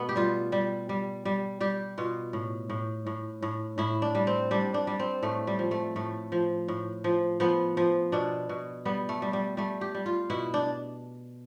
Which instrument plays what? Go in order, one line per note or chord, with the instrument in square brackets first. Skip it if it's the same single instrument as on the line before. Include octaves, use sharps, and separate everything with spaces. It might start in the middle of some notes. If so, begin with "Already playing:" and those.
Already playing: [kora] B2 A3 B3
G4
G3 F4
G3
G3
G3
G3 G4
B2 F4
A2
A2
A2
A2
A2 E4
D4
G3
C4
G3 D4
D4
G3
C4
A2 A3
G3
F3
A3
A2 A3
F3
A2
F3
F3 B3
F3
B2 D4
B2
G3 B3
A3
G3
G3
G3 A3
G4
G3
F4
B2 E4
D4